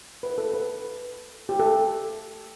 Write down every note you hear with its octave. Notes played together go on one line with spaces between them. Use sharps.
B4
A4
B4
G4
A4